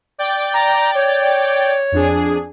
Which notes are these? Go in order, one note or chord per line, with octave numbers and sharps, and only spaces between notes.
D5 G5 A6
A#5
C#5
F2 D4 G#4